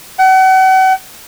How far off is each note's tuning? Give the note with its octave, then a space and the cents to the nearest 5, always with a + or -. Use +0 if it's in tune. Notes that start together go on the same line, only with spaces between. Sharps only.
F#5 +35